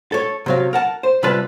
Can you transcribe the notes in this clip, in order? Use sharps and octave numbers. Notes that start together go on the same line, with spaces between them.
A4 C#5
C3 F#3 F5
A#4 F#5 A5
C5
C3 G3 F4 B4 A5